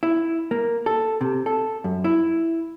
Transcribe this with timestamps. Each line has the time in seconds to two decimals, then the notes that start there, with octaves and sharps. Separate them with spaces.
0.03 E4
0.51 A#3
0.86 A4
1.21 C3
1.46 A4
1.84 F#2
2.04 E4